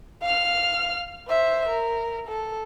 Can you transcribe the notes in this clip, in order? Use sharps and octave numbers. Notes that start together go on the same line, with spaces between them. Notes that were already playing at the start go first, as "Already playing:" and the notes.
F5 F6
C5 E5
A#4
A4